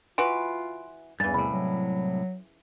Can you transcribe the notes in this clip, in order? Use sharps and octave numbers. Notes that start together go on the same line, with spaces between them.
E3 F4 F#4 B4 C6 D7
E2 G2 C#3 E3 A6
C2 A2 B5
F#3